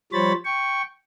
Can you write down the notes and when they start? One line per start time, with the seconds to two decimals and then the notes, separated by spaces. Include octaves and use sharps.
0.12 F3 G3 C5 C#5 B5 A6
0.45 G5 C#6